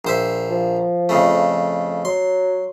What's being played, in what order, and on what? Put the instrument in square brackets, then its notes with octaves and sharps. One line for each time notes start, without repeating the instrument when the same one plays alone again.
[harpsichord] A#1 C5 E5
[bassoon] F3
[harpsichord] F2 C#3 A3
[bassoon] F#3 [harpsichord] C6